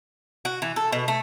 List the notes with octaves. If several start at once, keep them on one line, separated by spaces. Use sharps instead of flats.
F#4
E3
A4
B2
A3